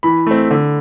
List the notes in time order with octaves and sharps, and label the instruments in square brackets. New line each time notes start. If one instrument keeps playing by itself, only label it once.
[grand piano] E3 B5
A3 C4
D3